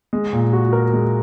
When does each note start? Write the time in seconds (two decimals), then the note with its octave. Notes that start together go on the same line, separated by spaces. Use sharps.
0.13 G#3
0.33 A#2
0.53 F#4
0.73 A#4
0.93 G#3